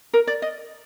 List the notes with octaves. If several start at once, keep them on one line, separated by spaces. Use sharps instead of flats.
A#4
D5
D#5